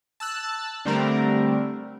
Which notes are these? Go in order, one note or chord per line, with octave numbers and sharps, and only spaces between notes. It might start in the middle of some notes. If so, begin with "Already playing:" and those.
A5 E6 F#6 A6
D3 G3 A3 C4 D4 A#4